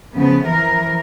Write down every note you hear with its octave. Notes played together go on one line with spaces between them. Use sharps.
C#3 F3 B3
E3 F3 A#4